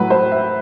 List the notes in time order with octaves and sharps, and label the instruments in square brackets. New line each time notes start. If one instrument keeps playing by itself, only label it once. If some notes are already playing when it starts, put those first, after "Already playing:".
Already playing: [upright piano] A2 F#3 B4
C5
E5